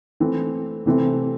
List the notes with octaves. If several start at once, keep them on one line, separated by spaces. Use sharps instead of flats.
E3 A3 C4
C3 E3 A3 C4